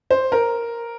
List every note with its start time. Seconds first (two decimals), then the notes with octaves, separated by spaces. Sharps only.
0.10 C5
0.32 A#4